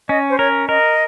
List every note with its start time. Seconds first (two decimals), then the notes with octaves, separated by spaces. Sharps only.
0.09 C#4 D#5
0.30 C5
0.38 A#4 C#5
0.68 A#4 D#5